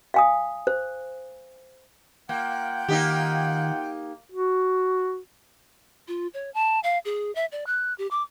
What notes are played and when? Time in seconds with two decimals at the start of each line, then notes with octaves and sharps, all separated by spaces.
0.14 F5 G#5 D#6
0.67 C5
2.29 A#3 F4 F#5 G5
2.88 D#3 A#3 D#4 G4
4.32 F#4
6.08 F4
6.34 C#5
6.54 A5
6.83 F5
7.05 G#4
7.35 E5
7.52 D5
7.66 F#6
7.98 G4
8.11 D6